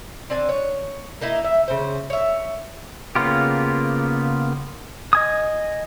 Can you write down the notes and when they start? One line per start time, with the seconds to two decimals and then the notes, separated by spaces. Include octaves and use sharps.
0.30 C4 D4 G#5
0.49 C#5
1.21 A#3 D#4 E4
1.44 E5
1.68 C#3 C5
2.10 C#5 E5
3.15 C#3 A#3 B3 F4 G4
5.13 D#5 G#5 D#6